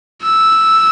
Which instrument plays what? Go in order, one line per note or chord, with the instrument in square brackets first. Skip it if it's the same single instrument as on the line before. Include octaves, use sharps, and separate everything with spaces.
[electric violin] E6